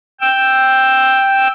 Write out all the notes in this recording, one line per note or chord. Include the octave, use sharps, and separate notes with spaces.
G5 E6